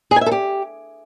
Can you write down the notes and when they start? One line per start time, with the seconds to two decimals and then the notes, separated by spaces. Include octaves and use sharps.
0.11 G#4
0.16 G#5
0.21 E5
0.26 A4
0.31 G4